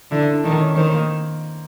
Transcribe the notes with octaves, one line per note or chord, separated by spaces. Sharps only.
D3 E4
E4
D4
D#3 D4
C#4
D#3 C4
A#3